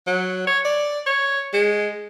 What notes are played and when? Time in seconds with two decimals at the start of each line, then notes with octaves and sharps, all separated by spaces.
0.07 F#3
0.47 C#5
0.65 D5
1.07 C#5
1.53 G#3